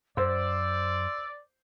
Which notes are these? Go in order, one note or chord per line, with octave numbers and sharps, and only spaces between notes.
F#2 C5 D5 E6